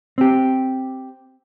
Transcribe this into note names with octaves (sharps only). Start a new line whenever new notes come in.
C4 G4